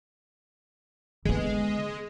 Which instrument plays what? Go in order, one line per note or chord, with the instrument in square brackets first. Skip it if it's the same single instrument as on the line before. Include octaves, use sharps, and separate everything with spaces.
[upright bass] D3 B3 [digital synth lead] G#3